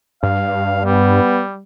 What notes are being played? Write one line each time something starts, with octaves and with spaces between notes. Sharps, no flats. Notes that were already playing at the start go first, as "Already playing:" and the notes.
G2 F5
G3 B3